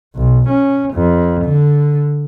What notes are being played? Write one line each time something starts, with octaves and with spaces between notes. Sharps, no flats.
B1
C#4
F2
D3